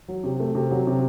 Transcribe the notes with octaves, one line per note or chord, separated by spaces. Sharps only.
F#3
C3
A3
C3
F#3
C3